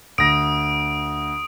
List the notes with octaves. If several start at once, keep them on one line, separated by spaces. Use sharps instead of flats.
D2 D#6 A#6 D7